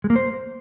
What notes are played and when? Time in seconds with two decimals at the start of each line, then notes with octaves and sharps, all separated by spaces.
0.04 G#3
0.10 A#3
0.16 C5